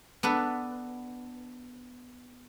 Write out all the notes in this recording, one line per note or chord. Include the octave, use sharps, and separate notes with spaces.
B3 D4 A4 B4